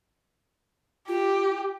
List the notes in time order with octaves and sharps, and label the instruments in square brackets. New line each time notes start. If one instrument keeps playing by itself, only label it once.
[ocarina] F4 [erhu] G4